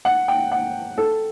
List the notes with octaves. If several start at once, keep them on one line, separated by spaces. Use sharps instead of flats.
F#5
G5
F#5
A4